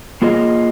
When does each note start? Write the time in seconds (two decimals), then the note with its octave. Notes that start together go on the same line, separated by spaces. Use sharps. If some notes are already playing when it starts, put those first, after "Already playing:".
0.22 A#3 F4 G#4 D#5